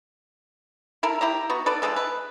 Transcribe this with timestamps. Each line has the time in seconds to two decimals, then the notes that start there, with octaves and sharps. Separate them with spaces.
1.03 E4 A4 A#4
1.21 E4 G4 A#5
1.50 B3 F#4
1.66 A4 B4 D5
1.82 D3 E3 G#3 A4
1.96 B4